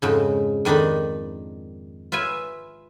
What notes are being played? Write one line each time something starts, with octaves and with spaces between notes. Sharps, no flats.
F2 G#2 C#3
F2 D#3 D4 D#4 B5
F4 B4 E5 G#5